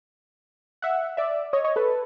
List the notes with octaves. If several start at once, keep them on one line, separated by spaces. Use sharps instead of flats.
E5 F#5
D5 E5
C#5 D#5
C#5 D#5
A4 B4